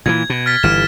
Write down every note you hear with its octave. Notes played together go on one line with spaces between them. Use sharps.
A#2 C#3 E3 G#6
B2
F6 A6 B6
G1 E3 F6 E7